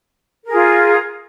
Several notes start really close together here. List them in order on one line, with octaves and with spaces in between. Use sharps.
A#4 G#4 F4